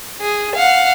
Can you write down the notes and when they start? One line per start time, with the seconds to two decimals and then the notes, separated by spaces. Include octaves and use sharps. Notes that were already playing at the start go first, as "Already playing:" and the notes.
0.21 G#4
0.56 F5 F#5